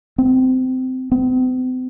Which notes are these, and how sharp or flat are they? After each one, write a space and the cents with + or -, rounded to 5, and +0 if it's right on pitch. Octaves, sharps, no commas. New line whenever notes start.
C4 -20
C4 -45